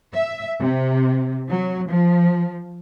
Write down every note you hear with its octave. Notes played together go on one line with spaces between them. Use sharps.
E5
C3
F#3
F3